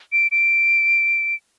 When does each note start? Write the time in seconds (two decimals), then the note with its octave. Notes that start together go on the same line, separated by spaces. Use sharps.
0.12 D7
0.32 D7